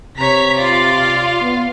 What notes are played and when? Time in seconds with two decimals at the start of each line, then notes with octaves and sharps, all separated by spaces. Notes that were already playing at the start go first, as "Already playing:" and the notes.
0.18 C3 C#5 A#5 B6
0.58 F4 D5 F5
1.42 B3